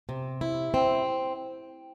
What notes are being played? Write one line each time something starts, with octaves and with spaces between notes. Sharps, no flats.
C3
E4
C4